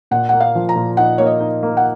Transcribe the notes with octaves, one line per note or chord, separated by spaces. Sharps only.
A#2 F#5
A#3 F#5
F5
F3
A#5
A#2
D#4 F#5
A#3 C#5
D#5
D#4
A#3
F#5